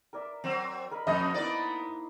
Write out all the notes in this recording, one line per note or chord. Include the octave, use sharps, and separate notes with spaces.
A#4 D5 E5
F#3 C4
A#4 D#5 B5
F2 A#3 C5 D#5 D#6 A#6
B3 D#4 E4 A#4 D5